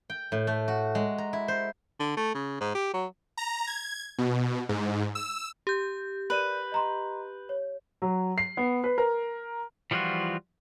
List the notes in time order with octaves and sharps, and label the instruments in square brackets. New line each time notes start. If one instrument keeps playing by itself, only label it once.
[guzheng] G5
A2
A3
F#4
G#3
A#5
E4
C5
[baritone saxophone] D3
A3
C#3
G#2
G4
F#3
[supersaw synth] A#5
G#6
B2
G#2
E6
[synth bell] G4 G6
[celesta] A#4 D5 D#7 [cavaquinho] B4
[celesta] D#5 A#5 C6
C#5
[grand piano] F#3
C7
B3
B4
A#4
[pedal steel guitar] E3 F3 G3 F4 F#4